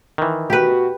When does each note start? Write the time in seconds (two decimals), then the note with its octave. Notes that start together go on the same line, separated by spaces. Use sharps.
0.18 D#3 E3
0.50 B2 F#4 G4 B4